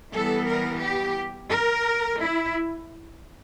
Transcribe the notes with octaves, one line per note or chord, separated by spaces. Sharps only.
E3 G3 B3 A4
A#4
G4
A#4
E4